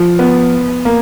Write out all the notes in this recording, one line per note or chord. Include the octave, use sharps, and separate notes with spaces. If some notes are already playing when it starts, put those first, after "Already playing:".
Already playing: F3
B3
A#3